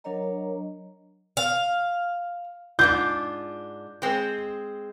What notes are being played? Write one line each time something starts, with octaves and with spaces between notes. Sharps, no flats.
F#3 D4 A#4 C#5 D#5 A#5
F5
G#2 D4 F4 G6
G#3 C4